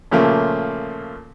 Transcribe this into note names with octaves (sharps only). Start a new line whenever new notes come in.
A#2 C#3 F3 A3 A#3